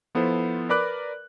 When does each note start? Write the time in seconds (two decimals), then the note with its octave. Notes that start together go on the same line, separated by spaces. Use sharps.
0.15 F3 B3 E4 A4 C5
0.69 A#4 B4 D5 B5 D6 F#6